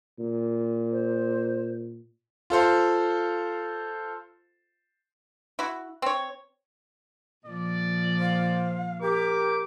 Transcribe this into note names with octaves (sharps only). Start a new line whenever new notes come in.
A#2
C5
F4 A4 C5 F5
E4 F#4
C4 C#5
A#2 F3 D5
C5 F5
G4 A#4 D6